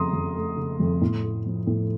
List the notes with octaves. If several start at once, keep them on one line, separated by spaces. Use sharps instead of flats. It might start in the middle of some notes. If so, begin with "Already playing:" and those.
Already playing: F2 C#3 A3 A#5 C6 D#6
F2
A3
C#3
F2
A2
A3
F3
A2